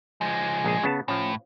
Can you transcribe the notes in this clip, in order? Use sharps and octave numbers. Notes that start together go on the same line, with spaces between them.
F3 G#3
A#1 G#4
C#3 B3 A5
A2 F3 C#4